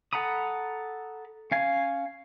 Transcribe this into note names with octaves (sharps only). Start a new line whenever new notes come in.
A4 F#5 A#5 B5 D#6
C#4 F5 G#5